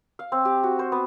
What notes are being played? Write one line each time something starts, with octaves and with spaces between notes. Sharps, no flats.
F5
C4
G4
F#4
C5
B3